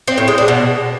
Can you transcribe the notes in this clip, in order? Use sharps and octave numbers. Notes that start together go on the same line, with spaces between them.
C4
A2
G#3
D4
B2